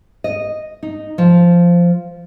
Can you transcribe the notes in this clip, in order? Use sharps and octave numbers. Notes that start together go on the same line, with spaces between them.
D#5
D#4
F3